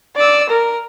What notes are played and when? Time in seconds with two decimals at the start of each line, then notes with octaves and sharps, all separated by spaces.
0.16 D5 E6
0.49 A#4